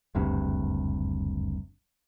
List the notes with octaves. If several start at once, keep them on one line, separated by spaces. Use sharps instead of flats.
F#1 D2 G2 C3